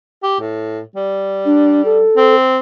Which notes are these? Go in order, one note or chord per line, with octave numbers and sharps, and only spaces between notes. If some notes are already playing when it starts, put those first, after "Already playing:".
G4
A2
G3
D4
A4
C4